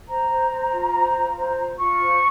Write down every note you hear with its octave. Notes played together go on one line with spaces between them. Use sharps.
C5 A#5
C5
C5
F4
C5
F4
C5
F4
F4 C#6
C5